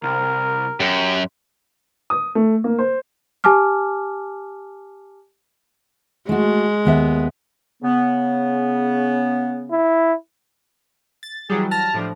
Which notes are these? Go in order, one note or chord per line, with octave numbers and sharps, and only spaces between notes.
C2 A#4
F#2 G4
D#6
A3
A#3
C5
G4 G#5 A5 D6 F6
G#3 A3 F#4
D#2 B3 E5
C#3 B3
E4
A6
E3 F#3 G3 G#4
A5 F6 A#6
A2 F3 D4